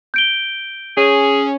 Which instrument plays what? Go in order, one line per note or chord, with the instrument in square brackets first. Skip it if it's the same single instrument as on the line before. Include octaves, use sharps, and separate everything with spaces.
[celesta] G6 D7 G7
[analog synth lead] C#4 [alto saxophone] G#4